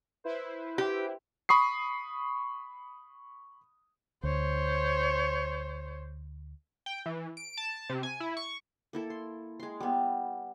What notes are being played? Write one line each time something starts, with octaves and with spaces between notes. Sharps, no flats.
E4 B4 C5
G4
B5 C#6 D#6 C7
D2 C5 C#5
G5
E3
D7
A5
C3
G#5
E4
C#6
A#3 E4 A4
C6
G#3 C6
G3 B3